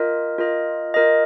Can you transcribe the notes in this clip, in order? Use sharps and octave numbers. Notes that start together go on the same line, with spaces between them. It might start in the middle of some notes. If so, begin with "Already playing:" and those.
Already playing: F4 A#4 D#5
F4 A#4 D#5
F4 A#4 D#5